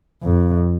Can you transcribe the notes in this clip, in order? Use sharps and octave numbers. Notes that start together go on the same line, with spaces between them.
F2